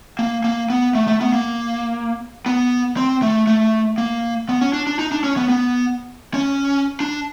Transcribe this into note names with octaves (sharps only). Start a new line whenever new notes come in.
A#3
A#3
B3
A3
A3
B3
A#3
B3
C4
A3
A3
A#3
B3
C#4
D4
D4
D#4
D4
C#4
B3
B3
C#4
D4